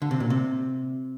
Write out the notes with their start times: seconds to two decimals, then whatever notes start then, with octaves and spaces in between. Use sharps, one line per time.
0.02 D3
0.11 C3
0.20 A#2
0.30 C3